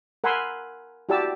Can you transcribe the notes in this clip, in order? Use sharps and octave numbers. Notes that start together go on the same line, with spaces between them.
A#4 F#5 G#5 B5 C6 E6
E4 F#4 G4 D5 A5 E6